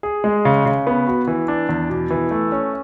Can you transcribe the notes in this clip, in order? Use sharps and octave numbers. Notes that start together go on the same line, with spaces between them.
G#4
G#3
C#3
C#3
B3
F#4
E3
D4
E2
B2
E3
A3
C#4